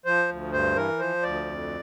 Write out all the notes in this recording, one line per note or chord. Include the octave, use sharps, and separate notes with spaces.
F3 C5
D2
G2 C5
E3 A#4
F3 C5
D2 D5
F2